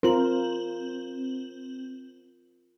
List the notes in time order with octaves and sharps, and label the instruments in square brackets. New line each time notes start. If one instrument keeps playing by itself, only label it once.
[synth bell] C4 F#7 [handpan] F4 A#4